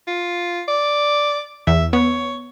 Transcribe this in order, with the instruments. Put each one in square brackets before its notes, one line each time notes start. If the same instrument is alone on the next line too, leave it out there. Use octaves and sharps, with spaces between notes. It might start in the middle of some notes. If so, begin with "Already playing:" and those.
[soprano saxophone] F4
D5
[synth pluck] E2 [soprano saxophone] E5
[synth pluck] B3 [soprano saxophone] C#5